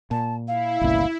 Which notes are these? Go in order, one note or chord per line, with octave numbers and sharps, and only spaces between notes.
A#2 A5
E4 F5
G1 C#2 A#2